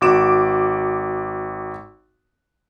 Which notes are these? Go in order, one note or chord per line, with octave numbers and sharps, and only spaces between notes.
G#1 F#4 D6 E7